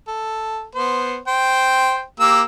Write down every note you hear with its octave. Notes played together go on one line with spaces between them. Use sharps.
A4
B3 C5
C5 G5
A#3 G4 E6